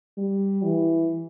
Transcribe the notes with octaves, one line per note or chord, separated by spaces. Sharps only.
G3
E3